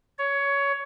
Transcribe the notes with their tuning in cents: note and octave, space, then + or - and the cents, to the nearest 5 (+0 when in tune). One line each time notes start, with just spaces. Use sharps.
C#5 +15